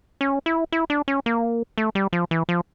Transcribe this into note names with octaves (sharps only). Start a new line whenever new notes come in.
C#4
E4
E4
D4
C#4
A#3
A3
G3
F3
E3
F3